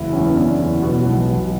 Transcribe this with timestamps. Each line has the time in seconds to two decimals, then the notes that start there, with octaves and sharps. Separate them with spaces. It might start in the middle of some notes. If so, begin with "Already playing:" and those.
Already playing: F#1 E2 E4
0.13 E2 C#4
0.25 B3
0.36 D3 C#4
0.59 E2
0.82 B2 B3
1.06 B1
1.28 B2